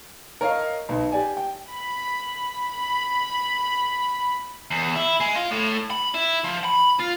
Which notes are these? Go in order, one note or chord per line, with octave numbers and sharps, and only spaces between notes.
A#4 C#5 D#5 F5
B1
G4 D5 G#5
G5
B5
B5
E2
E4
G#3
F4
A2
B5
E4
F3
B5
F4